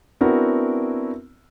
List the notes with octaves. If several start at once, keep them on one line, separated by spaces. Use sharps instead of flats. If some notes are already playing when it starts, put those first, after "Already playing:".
B3 C4 D4 E4 F#4 A#4